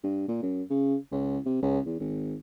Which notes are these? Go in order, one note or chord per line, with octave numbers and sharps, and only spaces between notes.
G2
A#2
F#2
C#3
C#2
C3
C#2
E2
G#1